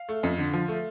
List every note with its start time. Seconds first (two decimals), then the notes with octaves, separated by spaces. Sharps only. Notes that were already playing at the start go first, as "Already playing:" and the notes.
Already playing: F5
0.09 A3
0.23 F2
0.38 D3
0.53 F3
0.68 A3